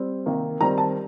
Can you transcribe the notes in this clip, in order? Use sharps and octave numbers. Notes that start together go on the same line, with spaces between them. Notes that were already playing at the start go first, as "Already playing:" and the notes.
Already playing: G3 C4
C3 D#3 A#3
D#3 G3 C4 A#5
A5